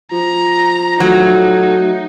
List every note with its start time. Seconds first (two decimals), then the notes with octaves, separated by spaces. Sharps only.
0.12 F3 A#5
1.00 F#3 A3 D#4